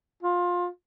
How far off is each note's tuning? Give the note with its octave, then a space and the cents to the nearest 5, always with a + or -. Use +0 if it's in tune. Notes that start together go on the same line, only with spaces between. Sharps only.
F4 +20